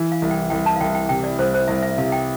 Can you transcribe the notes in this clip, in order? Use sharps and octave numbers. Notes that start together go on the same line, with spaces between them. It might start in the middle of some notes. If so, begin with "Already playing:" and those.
Already playing: E3
F5
C2
G5
C2 G5
A5
F5
C2 G5
G5
C3 G5
D5
C2 C5
C5
C2 E5
E5
C3 F5
G5